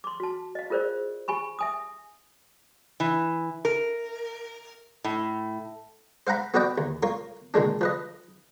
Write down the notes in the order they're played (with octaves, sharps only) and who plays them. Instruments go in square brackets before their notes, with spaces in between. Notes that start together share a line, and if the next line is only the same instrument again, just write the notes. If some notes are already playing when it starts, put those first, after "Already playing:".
[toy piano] C6 D6
F#4 A5
D#5 F5
F4 G#4 A#4 C5 D5
G4 G#5 B5 C#6
E5 G#5 D#6
[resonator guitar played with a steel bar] E3
A#4
A2
[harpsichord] C5 F5 F#5 A#5 B5
B3 F#4 B4 D5 D#5 G5
D#2
F4 A#4 C#5 F5
A#2 D#3 G#3 D4
F3 B4 D#5